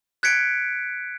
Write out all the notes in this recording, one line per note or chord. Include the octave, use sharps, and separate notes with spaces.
F#6 G#6 B6 C#7 D7